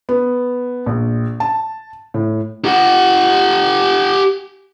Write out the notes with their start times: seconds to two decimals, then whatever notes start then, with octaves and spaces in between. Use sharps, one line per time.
0.09 B3
0.86 A#1
1.40 A5
2.14 A2
2.65 G4 F#5